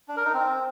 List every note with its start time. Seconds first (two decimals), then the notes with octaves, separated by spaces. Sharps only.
0.08 D4
0.17 A#4
0.25 D#4
0.34 C4